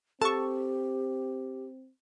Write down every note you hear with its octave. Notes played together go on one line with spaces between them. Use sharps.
C4 G4 A4 A5 C#6